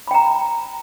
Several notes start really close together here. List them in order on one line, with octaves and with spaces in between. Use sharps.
B5 G5 A#5